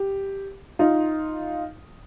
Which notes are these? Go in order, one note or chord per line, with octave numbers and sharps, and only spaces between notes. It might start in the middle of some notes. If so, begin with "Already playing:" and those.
Already playing: G4
D#4 F4